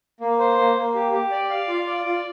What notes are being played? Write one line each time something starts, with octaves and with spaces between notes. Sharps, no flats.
A#3
C5
A#3
A#3
G4
G4
D5
F5
F4
D5
F4